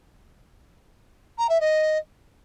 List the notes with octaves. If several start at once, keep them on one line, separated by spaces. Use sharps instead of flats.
A#5
E5
D#5